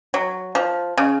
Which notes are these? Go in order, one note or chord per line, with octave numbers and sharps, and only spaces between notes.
F#3
F3
C#3